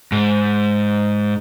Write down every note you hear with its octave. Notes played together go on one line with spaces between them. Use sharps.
G#2